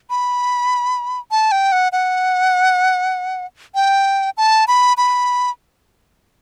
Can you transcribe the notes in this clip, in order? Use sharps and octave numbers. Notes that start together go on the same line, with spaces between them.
B5
A5
G5
F#5
F#5
G5
A5
B5
B5